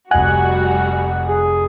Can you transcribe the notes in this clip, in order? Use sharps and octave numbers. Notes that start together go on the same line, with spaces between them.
F1 G3 F#4 D#5 F#5 G#5 F#6
G#4